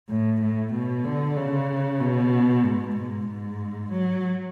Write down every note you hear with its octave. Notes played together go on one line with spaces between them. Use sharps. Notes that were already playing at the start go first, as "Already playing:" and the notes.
A2
A2
B2
D3
C#3
B2
G#2
G#2
G#2
F#3